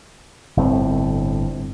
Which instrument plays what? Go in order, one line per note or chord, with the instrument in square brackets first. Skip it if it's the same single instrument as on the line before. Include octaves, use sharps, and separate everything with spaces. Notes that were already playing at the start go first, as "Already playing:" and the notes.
[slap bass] G1 A2 C4